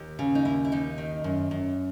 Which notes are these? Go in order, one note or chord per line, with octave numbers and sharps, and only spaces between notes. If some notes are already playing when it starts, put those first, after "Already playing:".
Already playing: D#2
C#3
D#4
D#2 E4
E4
D#2 D#4
D#3
F#2
F#2